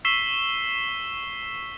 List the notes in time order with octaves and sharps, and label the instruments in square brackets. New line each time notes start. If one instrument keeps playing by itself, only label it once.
[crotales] C#6 E6 B6 C7 E7 G7